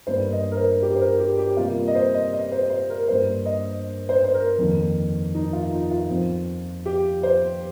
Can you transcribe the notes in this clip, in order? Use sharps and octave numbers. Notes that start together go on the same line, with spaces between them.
G2 G3 A#3 C5
D#5
A#4
C5
G4
C5
A#4
G4
G4
C3 G3 A#3 F4
D#5
C5
D#5
D#5
C5
C5
A#4
G2 G3 A#3 C5
D#5
C5
C5
A#4
F2 D#3 A#3
D#4
F4
D#4
F4
F2 F3 C4
G4
C5